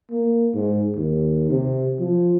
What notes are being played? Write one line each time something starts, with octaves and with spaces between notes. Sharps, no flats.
A#3
G#2
D#2
C3
F3